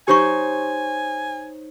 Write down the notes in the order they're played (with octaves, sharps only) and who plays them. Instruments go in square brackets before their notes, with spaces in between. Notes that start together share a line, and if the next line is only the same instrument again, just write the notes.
[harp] D#4 C5 C#5 [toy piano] G4 C#6 [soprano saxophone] G#5